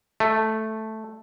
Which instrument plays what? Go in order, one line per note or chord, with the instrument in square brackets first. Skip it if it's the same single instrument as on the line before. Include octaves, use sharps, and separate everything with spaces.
[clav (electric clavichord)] A3